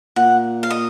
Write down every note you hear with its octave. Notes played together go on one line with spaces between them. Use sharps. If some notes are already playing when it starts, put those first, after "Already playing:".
A#2 F#5
F5
D#5